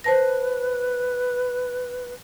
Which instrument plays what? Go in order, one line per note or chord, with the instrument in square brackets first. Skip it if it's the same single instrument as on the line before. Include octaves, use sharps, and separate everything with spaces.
[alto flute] B4 [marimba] C5 A5 A#6